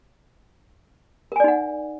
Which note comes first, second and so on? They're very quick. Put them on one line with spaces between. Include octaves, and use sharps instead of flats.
A#4 G#5 D5 D#4 F#5